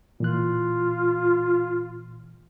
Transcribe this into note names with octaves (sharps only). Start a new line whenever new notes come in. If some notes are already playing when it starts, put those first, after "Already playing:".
A#2 E3 F4 F#6